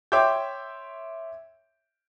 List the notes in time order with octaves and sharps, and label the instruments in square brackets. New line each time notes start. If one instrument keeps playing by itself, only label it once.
[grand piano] C#5 E5 G5 C6 D6 G6